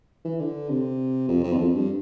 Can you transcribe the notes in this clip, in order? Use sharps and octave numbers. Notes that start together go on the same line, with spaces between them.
E3
D3
C3
F2
F2
E2
F2
G2